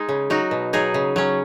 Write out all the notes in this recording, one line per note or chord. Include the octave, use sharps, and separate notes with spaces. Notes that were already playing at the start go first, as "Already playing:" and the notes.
Already playing: G#3 D#4
C#3
F#3 D#4 F#4
B2
F#3 D#4 G#4
C#3
F#3 C#4